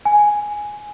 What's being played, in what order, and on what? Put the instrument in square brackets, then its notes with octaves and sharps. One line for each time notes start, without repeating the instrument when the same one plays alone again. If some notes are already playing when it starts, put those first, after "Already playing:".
[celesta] G#5